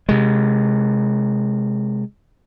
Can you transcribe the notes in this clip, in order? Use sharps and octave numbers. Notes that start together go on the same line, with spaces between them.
C3 G#3